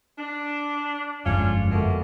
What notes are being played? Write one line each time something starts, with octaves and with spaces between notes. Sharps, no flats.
D4
G1 F2 G#3 C#4 D4 F4
B2 A3 A#3